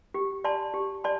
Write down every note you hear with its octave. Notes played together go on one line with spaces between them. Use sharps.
G4
D5 A5 C6
G4
D5 A5 C6